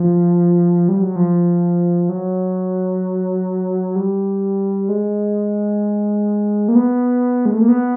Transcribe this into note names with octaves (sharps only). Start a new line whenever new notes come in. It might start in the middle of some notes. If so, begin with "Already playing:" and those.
Already playing: F3
G3
F#3
F3
F#3
G3
G#3
A#3
B3
G#3
A3
A#3
B3